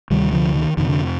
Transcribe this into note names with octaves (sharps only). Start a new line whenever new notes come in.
D2 C3 D#3 G3
D3 F3
D#3
F2 C3 D#3
D3